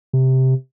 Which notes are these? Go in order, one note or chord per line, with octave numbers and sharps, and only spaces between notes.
C3